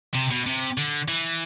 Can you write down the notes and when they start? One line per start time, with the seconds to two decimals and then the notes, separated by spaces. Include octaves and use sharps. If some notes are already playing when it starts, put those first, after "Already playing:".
0.15 C3
0.31 B2
0.47 C3
0.78 D3
1.08 E3